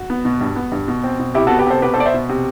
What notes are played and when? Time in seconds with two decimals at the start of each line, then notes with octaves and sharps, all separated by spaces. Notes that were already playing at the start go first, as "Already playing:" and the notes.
Already playing: F#4
0.10 B3
0.25 B2
0.41 G2
0.56 B3
0.72 G2
0.88 B2
1.04 C4
1.19 B2
1.35 C3 E4 G4
1.47 B3 F#4 A4
1.59 G4 B4
1.67 C3 A4 C5
1.82 B2 G4 B4
1.94 A4 C5
1.98 B3 D5
2.06 C5 E5
2.14 B2
2.29 C3